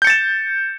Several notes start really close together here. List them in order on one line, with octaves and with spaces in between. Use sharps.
G6 C#7 A6 E7